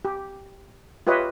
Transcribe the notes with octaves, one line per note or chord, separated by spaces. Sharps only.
G4
F4 G4 B4 C#5 D#5 E5